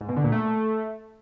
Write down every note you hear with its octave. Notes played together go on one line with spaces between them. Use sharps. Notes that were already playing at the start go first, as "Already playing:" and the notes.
G#2
B2
D3
A#2
A3